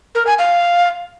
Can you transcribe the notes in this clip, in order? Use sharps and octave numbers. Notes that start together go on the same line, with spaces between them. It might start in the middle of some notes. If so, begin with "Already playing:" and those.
A#4
G#5
F5